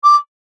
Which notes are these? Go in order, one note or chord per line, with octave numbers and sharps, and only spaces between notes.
D6